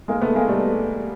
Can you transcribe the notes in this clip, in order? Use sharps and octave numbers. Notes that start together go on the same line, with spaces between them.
G#3 A#3
A3 B3
G#3 A#3
G3 A3